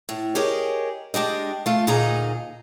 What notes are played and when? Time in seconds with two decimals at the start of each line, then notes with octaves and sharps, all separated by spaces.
0.09 A2
0.35 G4 G#4 A#4 C#5 D#5
1.14 G#3 D4 G4 D#5
1.66 A3 F4
1.87 D2 A#2 D#4 G#4 D#5 A#5